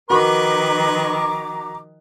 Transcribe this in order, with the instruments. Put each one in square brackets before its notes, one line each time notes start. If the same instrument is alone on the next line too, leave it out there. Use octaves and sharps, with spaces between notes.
[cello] D#3 F3 [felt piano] F#4 A#4 [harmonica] B4 C#6 [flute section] A#5 D6